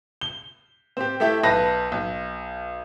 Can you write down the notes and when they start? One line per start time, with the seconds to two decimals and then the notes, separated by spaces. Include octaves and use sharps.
0.21 G7
0.97 C4 G4
1.20 A3 E4 G4 E5
1.43 B1 B4 A5 B5 A#6
1.92 B1